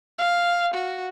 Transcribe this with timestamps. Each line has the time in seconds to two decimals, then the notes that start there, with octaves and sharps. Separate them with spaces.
0.18 F5
0.74 F#4